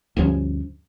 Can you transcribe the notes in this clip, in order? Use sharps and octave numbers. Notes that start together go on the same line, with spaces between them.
D2 G2 F3 C#4